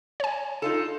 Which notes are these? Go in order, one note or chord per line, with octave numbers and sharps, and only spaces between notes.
C#5 G#5
D#4 F4 A4